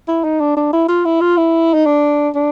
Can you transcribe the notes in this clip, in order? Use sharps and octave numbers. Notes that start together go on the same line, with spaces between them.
E4
D#4
D4
D4
E4
F4
E4
F4
E4
D#4
D4
D4